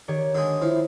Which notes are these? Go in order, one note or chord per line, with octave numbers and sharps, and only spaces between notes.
D#3 G4 C#5
D3 G#3
F3 E4